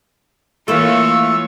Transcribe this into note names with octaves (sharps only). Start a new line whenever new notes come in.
E3 A3 A#3 F4 C#5 E6